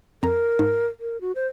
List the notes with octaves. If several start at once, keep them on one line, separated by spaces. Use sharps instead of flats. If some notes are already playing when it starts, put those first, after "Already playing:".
F2 A#4 A#5
G#2
A#4
F#4
C5